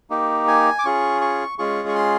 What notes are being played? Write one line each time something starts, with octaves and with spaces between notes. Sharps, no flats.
A#3 D#4 G4
G#5
D6
C#4 F4 G#4 C#6
C#6
G#3 C#4 F4 G#4 C#6
C#6
C6